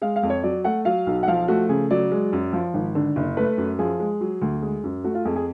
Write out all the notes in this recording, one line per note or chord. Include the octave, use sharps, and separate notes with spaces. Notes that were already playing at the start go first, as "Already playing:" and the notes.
G#3 F5
F5
F2
C#5
F#3 D5
A3 F#5
F#3 F5
B1
F#5
F3 F5
A3 F#4
C#3 G#4
F#3 D5
G#3
F#2
F3
G#1
D3
F#1
A3 B4
F#2
F3 G#4
G#3
F#3
D2
G#3
F#2
A3 F#4
F4
F2 G#4
G#4